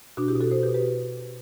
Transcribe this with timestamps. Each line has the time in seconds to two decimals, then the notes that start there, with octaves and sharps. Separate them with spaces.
0.17 B2 D4 F#4
0.28 E4 G4
0.35 B2
0.40 F#4 A4
0.51 B2 A4 C5
0.63 G4 B4
0.68 B2
0.74 G4 B4